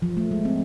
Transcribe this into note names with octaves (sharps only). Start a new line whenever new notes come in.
F3
A3
G#3
C4